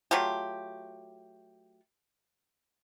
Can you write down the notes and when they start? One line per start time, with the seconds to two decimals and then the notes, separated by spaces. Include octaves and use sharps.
0.11 F#3 A3 F4 G4